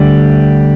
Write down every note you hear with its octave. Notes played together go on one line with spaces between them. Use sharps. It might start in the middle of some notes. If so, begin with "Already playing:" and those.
Already playing: D2 D3 G3